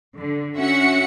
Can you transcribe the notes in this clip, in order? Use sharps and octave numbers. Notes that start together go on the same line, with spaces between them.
D3
C#4 F#4 E5 F#5 C#7